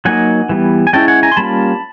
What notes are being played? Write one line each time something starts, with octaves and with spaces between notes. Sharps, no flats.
F#3 A#3 D#4 F#5 G#5
E3 G3 B3
G#5
G#3 C#4 E4 G5 A5
F#5 G#5
G#5 A#5
C6
G3 A#3 C#4 F4 A5 B5